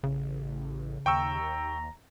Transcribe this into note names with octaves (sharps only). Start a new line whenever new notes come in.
A1 C#3
D#2 G5 A#5 C#6 E6